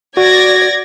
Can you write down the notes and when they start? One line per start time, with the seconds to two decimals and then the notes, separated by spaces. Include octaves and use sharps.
0.17 F#4 D5 G#6 A#6